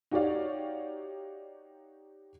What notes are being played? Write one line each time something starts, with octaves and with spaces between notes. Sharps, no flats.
D#4 F#4 G4 C#5 D5 F5